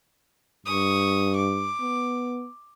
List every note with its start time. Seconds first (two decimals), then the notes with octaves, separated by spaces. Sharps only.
0.66 G2 C#6 D#6
1.36 D6
1.81 B3